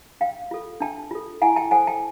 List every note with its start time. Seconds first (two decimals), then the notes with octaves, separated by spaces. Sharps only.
0.20 D4 F5 G5
0.51 F4 A4
0.81 D4 G5 A5
1.11 F4 A4
1.42 E4 F#5 G#5
1.56 G5 A5
1.71 A4 C5 F#5 G#5
1.87 G5 A5